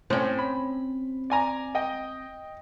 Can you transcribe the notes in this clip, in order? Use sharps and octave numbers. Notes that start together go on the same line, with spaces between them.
A2 C4 C#4
B5
D5 G#5 A#5
D#5 G5